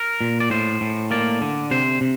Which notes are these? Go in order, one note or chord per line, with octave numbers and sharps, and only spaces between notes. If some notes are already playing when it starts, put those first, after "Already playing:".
Already playing: A#4
A#2
D5
A2 C5
A2
A#3 D5
D3
C3 C5
C3